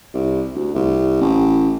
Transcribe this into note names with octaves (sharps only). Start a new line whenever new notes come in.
C2
D2
C2
A1